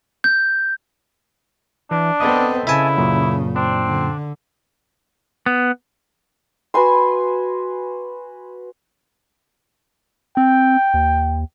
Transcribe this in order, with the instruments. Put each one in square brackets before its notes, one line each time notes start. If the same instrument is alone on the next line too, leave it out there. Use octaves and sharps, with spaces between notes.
[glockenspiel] G6
[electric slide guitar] E3 [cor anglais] D4
[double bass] B3 C4 [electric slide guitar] A4 B4 D#5
[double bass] C#3 [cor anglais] E4 [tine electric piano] E5 G#5 A5
[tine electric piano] F#2 A#2
[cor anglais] C4 [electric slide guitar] D4
[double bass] D3
[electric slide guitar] B3
[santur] F#4 B4 G#5 C6
[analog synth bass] C4 [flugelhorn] G5
[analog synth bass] D#2